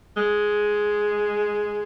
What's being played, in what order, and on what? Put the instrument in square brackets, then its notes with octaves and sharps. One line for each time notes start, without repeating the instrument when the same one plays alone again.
[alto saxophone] G#3